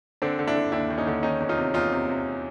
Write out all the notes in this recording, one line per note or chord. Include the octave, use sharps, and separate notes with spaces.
D3 C4 D4
D3
D4 E4
D3
D#2 D4 E4
D#2
C#4 D#4
D3
D#3 C#4 D#4
E2
D#4 F4
C3
E2 D#4 F4
C3
C3